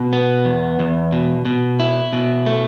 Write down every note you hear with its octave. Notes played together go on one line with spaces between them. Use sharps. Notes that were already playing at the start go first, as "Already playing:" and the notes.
Already playing: B2
B3
E2
E2
B2
B2
E4
B2
A3